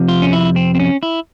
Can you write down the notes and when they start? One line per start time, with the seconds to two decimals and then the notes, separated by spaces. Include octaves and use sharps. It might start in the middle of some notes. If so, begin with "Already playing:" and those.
Already playing: F2 C3 F3
0.09 F4
0.22 C#4
0.32 E4
0.56 C4
0.75 C4
0.80 C#4
1.03 E4